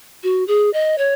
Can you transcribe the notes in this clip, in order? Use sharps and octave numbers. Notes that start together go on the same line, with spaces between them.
F#4
G#4
D#5
C#5